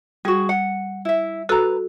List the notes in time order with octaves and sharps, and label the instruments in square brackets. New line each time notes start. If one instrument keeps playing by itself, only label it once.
[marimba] G3 [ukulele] F#4 G#4
[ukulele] F#5
E4 E5
[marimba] F#4 A4 E6 [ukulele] B4 A#5